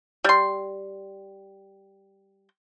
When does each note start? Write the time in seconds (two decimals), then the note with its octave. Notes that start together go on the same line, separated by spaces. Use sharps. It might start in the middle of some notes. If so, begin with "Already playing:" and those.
0.25 G3 C6